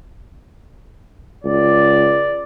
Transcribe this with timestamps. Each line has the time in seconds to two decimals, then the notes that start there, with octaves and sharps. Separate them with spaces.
1.44 C#2 D5